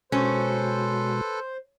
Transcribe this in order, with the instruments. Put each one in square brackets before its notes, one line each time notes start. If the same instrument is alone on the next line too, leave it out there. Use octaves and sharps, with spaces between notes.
[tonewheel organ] B2 G#3 F#4 [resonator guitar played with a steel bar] C#4 [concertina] A4 B4 [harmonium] C5